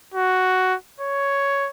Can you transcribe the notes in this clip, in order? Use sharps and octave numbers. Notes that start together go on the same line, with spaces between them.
F#4
C#5